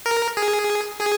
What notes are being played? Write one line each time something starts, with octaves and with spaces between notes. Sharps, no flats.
A#4
G#4
G#4